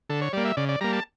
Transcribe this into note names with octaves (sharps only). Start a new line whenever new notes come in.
D3 A4
C#5
G3 A#3 D5
E5
C#3 D5
D5
G3 A#3 A#5
A5